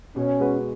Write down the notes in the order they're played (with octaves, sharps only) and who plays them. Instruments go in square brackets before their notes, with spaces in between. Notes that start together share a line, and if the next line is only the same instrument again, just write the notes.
[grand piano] B2 [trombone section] C#4
[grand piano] G#3 B3 F#4 B4